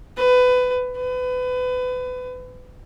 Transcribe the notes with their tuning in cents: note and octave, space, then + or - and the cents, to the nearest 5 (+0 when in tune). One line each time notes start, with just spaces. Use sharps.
B4 +20
B4 +30